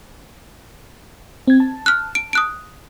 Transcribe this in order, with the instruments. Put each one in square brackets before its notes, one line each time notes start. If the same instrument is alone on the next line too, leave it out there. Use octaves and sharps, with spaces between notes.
[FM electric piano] C4 G#6
A5
[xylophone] F6 F#6
D7
D#6 F#6 D7